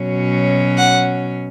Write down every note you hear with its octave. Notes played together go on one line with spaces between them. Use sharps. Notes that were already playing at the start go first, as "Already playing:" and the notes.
Already playing: B2 F#3 C#4
F#5